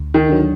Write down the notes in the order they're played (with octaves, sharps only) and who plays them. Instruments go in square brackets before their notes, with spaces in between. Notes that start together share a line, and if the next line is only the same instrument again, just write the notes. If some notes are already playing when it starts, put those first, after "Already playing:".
Already playing: [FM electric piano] D2
[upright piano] D#3
[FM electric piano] D3 F#3